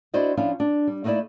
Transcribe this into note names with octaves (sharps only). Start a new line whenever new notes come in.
D4 E4 F#4 C5 D5 D#5
F3 C#4 D4 E4 F4 F5
D4
G3
A3 A#3 D#4 E4 D5 E5